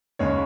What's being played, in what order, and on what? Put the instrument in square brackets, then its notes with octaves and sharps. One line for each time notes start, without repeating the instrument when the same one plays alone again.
[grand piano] D#2 C#3 G#3 C#5